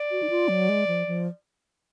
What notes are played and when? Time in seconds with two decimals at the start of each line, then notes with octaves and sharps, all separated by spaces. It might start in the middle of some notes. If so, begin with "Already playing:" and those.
Already playing: D5
0.11 F#4
0.23 D#4
0.30 F4
0.49 F#3
0.69 G#3
0.87 F3
1.07 F3